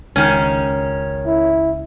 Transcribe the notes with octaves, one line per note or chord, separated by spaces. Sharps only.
C#2 D#3 C#4
E4